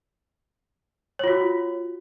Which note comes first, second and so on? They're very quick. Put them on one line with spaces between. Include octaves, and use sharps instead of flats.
C#5 F4 F#4